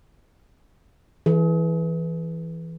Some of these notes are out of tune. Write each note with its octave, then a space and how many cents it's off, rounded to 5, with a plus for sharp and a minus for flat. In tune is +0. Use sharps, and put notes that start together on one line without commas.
E3 +0 G#4 +40